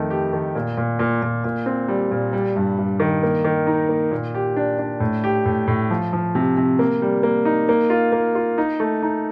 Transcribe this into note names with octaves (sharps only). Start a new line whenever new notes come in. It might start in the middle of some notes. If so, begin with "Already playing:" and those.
Already playing: F2 D#3 A3
G4
D#3
A#2
A#2
A#2
A#2
A#2
C4
G3
A#2
G3
G2
G2
D#3
A#3
D#3
D#4
A#3
A#2
G4
D4
D4
A2
G4
A2
A2
F3
F3
C3
C3
A#3
G3
A#3
D#4
A#3
F4
A#3
F4
D#4
A3
D#4